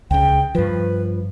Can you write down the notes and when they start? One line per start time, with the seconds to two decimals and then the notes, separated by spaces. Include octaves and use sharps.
0.11 C#2 C#3 G5
0.55 G2 F3 B4